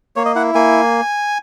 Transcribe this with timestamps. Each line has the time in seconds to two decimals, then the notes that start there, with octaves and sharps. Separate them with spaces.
0.16 A#3 C#5
0.25 D#5
0.35 E4 F#5
0.55 A#3 G#5